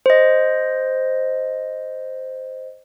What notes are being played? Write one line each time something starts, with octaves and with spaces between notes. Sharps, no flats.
C5 D#5